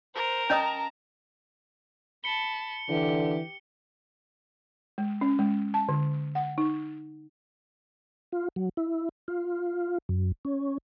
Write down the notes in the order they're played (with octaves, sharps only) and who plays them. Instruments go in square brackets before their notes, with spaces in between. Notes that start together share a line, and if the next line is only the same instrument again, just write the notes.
[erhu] A#4 [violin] C5
[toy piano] C#4 D#5 D#6 [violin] A5 A#5
[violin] A5 B5 [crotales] C#7 G7
[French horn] D3 [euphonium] E3 [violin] G4
[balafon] G#3
C#4
G#3
A5
D3
F#5
D#4
[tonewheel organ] F4
F#3
E4
F4
F#2
C#4